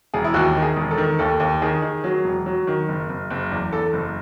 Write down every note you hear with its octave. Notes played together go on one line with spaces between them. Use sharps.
E1 G#4
E4
D#2 F#4
D#3
G#4
E1
A4
D#3
D#2 A4
D#2
D#3 G#4
D#3
F#3
E1
F#3
D#3
F#1
F#1
F#1
E2
E2 A4
F#1